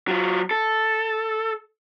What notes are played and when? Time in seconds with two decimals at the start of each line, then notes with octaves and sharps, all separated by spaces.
0.08 F#3 F4
0.51 A4